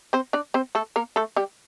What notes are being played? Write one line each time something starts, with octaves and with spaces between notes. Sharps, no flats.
C4 C5
D4 D5
C4 C5
A3 A4
A#3 A#4
A3 A4
G3 G4